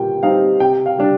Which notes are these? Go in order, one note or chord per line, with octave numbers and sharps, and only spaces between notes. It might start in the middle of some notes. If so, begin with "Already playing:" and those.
Already playing: A#2 G3 G5
G3 C4 D#4 F5
C3 G5
F5
G3 D4